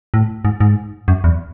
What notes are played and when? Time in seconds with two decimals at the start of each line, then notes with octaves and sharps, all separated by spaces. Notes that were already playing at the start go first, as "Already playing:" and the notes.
0.14 A2
0.45 G#2
0.60 G#2
1.08 F#2
1.24 E2